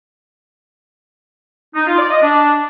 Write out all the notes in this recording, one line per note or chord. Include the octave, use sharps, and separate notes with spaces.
D#4
F4
D5
D#5
D4